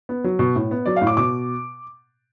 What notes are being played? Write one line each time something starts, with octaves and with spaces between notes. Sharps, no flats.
B3
F#3
B2
A2
B3
F#3 D5
A2 F5
D6
B2 D6